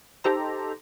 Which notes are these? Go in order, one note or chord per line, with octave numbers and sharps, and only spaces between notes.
D#4 G4 A4 C5 A#5